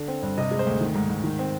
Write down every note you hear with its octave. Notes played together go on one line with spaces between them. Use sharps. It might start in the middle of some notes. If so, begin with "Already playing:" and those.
Already playing: D3
C4
G2
C3 D#5
G#3
C5
D2
D#3
G#2
G#2
D#3
C4